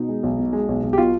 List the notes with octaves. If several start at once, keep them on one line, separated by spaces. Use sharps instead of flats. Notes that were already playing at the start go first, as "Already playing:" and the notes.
Already playing: B2 D#4
G#3
B1
B2
G#3
B1
B1
G4
B2 F4